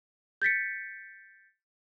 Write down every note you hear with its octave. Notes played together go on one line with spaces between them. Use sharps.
G6 A6 B6 C#7